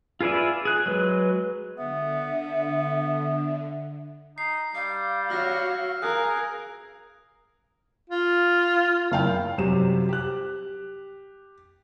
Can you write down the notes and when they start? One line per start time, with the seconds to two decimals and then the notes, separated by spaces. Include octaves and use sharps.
0.21 F4 G#4 B4 D5 E5
0.65 G#4 F#6
0.86 F#3 G#3 B4
1.77 D3 B3 E5
4.38 D#4 C7
4.75 G3 F5 C7
5.29 F#4 C#5 E6 F6 A#6
6.02 G#4 A#4 F#6
8.09 F4
9.11 F#1 F5 G5
9.58 F#2 C3 G3 G4 E7
10.09 G4 F#6